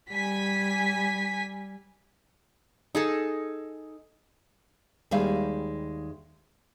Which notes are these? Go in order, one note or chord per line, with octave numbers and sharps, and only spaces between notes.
G3 G#5 B6
D#4 G#4 A4
D#2 G3 G#3 B4 E5 F5